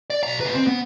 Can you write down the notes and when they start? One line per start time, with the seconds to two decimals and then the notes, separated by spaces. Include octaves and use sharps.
0.10 D5
0.23 B1 A#5
0.41 D3 B4
0.54 C4
0.67 B3